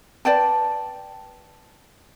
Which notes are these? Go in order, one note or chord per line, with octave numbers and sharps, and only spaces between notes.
B4 D5 G5 A5